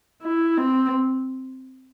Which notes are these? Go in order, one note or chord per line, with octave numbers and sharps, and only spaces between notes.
E4
C4